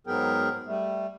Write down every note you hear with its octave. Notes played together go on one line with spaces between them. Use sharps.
G#2 F#3 B3 G#4 A#4 G5
G3 A3